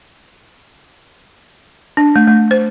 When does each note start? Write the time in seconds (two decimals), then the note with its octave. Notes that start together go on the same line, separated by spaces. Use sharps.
1.97 D4
2.16 A3
2.27 A3
2.51 C5